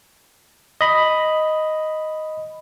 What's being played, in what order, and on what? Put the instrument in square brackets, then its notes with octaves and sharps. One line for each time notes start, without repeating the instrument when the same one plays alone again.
[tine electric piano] D#5 B5